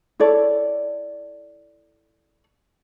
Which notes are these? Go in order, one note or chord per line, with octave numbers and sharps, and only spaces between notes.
E4 A4 C#5 D5